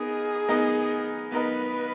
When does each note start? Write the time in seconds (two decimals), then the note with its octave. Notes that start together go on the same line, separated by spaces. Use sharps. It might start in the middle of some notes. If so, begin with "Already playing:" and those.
Already playing: B3 D#4 G#4 A#4 D#5
0.49 B3 D#4 A#4 D#5
1.32 B3 D#4 A#4 B4 D#5